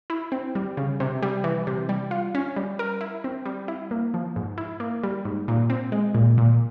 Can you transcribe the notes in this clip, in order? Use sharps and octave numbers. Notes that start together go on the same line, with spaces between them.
E4
C4
G3
C#3
C3
G3
E3
C3
G3
F4
C#4
G3
A#4
E4
C4
G3
E4
A#3
F3
G#2
E4
A#3
G3
G#2
A#2
C4
G#3
A#2
A#2